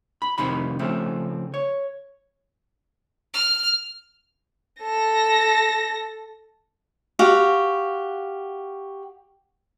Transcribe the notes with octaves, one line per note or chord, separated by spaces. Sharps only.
B5
C2 F2 C3 D#3 B5
C#3 F3 A3 C4
C#5
F6
A4 A#6
F#4 G4 F5